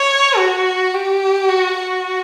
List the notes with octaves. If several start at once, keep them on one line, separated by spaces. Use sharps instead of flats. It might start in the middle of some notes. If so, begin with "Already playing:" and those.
Already playing: C#5
F#4
G4
F#4
F#4